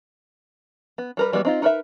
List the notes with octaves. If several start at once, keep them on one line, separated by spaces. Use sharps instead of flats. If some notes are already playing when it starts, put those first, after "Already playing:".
B3
G3 A#4 B4
E3 G3 G#3 B3 F#4
C4 D#4 F4
D#4 A#4 B4 D#5 E5